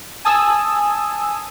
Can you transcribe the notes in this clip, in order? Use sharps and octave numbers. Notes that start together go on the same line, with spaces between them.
G#5 A5 D#6 E6